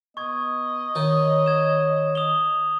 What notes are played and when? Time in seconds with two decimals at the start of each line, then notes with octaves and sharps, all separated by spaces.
0.17 B3 D#5 C#6 G#6
0.95 D#3 C#5
1.46 G#6 E7
2.15 D#6 F7 G7